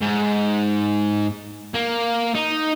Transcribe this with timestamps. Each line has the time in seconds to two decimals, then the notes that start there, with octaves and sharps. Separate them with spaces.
0.01 G#2
1.75 A#3
2.35 D#4